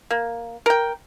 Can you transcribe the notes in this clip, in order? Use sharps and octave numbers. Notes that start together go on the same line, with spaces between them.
A#3
A#4 G5